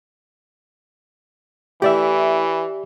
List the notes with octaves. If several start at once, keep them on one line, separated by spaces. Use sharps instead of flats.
E3 A3 E4 G4 D5 E5